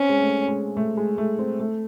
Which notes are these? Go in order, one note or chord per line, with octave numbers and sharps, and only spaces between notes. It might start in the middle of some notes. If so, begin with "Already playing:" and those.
Already playing: C4 C#4
G#3
A3
G#3
A3
G#3
A3
C4
A3